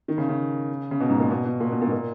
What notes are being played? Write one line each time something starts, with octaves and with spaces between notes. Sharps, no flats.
D#3
C#3
C#3
C#3
B2
G#2
A#2
B2
B2
A#2
B2
A#2
G#2
A#2